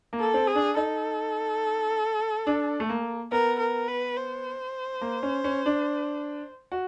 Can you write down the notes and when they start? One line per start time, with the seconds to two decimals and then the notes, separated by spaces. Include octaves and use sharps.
0.13 A#3
0.20 A4
0.34 C4
0.48 G#4
0.55 D4
0.77 D#4 A4
2.47 D4
2.80 A3
2.89 A#3
3.32 B3 A#4
3.60 A#4
3.88 B4
4.17 C5
5.01 A#3
5.23 C#4
5.44 C#4
5.66 D4
6.72 F#4